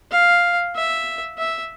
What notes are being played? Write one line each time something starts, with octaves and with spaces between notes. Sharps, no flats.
F5
E5
E5